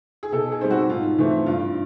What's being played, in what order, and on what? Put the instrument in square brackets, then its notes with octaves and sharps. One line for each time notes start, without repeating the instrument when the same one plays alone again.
[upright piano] G#4
B2 A4
G#4
G3 C4
F#4
G#2 F4
E3 A3 C4
G2 F4